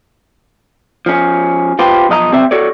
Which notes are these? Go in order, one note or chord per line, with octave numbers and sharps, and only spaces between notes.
F3 C#4
F4 G4 B4 C5
B1 F3 D#5 F5 A#5
B1 G3 C4 C5 E5
F#4 A4 C#5 D5